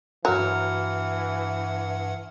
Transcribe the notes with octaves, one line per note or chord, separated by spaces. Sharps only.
G2 E3 F#3 F#5 A#5 F6